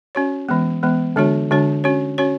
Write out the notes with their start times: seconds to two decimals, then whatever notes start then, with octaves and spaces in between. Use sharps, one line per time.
0.15 C#4 F#4 C#5
0.49 E3 G#3 B3
0.83 E3 G#3 B3
1.16 D3 G#3 D4 F#4 C#5
1.51 D3 G#3 D4 F#4 C#5
1.84 C#4 F#4 C#5
2.18 C#4 F#4 C#5